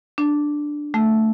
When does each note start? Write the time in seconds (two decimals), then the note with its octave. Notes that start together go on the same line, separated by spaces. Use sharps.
0.18 D4
0.94 A3